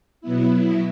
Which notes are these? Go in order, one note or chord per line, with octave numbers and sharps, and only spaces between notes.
B2 F#3 B3 E4